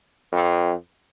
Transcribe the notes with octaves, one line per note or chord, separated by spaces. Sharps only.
F2